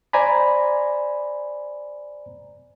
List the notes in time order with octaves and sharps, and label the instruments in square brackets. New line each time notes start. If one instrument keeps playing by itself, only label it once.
[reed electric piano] C5 D5 G#5 A#5 B5